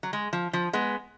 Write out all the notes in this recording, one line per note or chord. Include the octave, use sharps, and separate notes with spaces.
F#3
G#3
F3
F3
G#3 B3